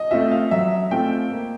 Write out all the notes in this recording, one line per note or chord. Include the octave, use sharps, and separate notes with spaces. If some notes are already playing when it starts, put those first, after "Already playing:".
Already playing: D#5
A3 C4 F4 E5
F5
F#3 E5
A3 C4 F4 G5
A#3